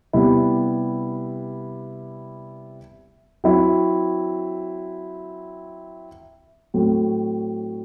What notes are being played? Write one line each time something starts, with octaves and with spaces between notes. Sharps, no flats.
C3 G3 B3 E4
F#3 C4 E4
A2 F#3 C4